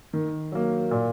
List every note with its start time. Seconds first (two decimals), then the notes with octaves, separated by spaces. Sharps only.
0.13 D#3
0.52 F#3 A#3
0.91 A#2